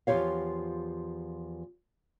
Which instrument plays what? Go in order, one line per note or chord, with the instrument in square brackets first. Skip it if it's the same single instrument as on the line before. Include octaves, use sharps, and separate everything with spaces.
[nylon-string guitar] E2 F3 F4 G4 C#5 F5